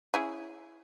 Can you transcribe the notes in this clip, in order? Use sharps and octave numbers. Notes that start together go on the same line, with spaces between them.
C#4 E4 G#4